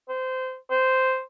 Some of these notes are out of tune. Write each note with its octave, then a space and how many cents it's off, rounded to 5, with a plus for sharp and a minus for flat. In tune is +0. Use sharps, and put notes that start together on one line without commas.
C5 -20
C5 -10